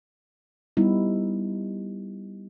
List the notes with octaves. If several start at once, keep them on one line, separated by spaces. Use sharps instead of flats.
G3 B3 D#4 E4